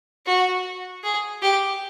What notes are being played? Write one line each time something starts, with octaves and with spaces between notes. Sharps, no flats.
F#4
G#4
G4